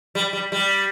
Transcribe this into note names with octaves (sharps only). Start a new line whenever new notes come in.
G3
G3
G3